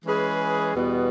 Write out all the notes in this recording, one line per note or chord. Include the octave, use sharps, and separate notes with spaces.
E3 G#3 C#4 G#4 B4
E2 B2 G3 B3